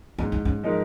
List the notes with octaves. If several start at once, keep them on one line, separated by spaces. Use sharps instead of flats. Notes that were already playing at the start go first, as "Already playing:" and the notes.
G#2 C#4
D#4
C#4
F3 G#3 D#4 A#4